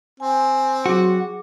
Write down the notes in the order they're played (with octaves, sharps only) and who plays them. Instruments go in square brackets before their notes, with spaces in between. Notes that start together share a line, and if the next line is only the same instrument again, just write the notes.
[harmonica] C4 [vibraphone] G#5
[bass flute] F#3 [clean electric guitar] F#4 [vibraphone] G#4 D6